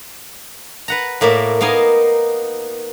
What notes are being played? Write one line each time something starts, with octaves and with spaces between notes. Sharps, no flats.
B4 F#5 A#5
A2 A#3 D5 E5
A#3 B3 D#4 F5 G#5